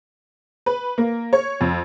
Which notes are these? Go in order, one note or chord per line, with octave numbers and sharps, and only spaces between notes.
B4
A#3
C#5
F2